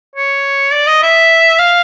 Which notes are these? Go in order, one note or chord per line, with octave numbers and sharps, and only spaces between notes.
C#5
D5
D#5
E5
F5